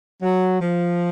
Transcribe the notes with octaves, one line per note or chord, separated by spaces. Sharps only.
F#3
F3